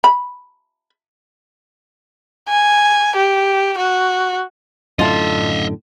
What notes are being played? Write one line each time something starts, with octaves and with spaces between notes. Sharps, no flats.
B5
G#5
G4
F#4
F#2 A2 D3 F4 A4 D#5 E5